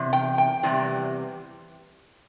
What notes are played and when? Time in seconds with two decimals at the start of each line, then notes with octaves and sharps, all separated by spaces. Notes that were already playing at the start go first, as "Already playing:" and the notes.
Already playing: E2 C3
0.13 G5
0.38 G5
0.63 E2 C3 E3 G3